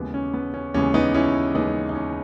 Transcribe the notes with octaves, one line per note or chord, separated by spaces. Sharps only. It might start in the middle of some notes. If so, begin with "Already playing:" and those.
Already playing: D#2 C#3 E3 G#3 B3
C#4
B3
C#4
D#2 C#3 E3 G#3 B3 C#4
B3 D#4
C#4 E4
D#2 C#3 E3 G#3 B3 D#4
D#4
C#4